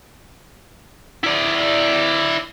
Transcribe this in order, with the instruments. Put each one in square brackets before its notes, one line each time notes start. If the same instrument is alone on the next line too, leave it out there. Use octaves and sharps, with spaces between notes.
[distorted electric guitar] E4 D5